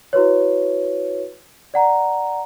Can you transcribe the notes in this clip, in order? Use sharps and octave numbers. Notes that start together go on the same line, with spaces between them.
E4 F#4 B4 C#5
D5 F#5 A#5